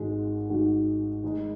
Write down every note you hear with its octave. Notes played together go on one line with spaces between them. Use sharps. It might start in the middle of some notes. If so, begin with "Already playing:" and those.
Already playing: G#1 G#2 D#3 G#3 F#4
G#1 G#2 D#3 G#3 F#4
D#3 G#3 D#4